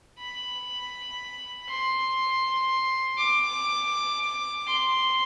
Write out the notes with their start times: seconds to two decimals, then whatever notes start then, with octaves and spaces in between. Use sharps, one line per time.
0.19 B5
1.69 C6
3.18 D6
4.67 C6